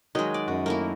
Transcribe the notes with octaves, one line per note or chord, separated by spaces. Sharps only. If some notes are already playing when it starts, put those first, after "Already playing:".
D#3 F#3 G#3 F#4 D#5
D5
F#2 F#4
A3 A#3 E4 A#4